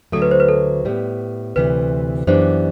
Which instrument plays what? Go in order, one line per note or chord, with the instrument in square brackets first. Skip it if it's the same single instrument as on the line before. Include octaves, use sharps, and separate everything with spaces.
[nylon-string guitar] D2 D3 F#3 A3 [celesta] A4
[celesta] B4
C5
B4
A4
[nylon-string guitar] A2 G3 B3
[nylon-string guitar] D2 C3 E3 G3 [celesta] B4
[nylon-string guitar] F#2 E3 G3 B3 D4 [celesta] C5